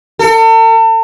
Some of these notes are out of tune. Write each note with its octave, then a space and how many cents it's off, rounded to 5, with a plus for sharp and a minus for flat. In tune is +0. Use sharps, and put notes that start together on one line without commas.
A4 +40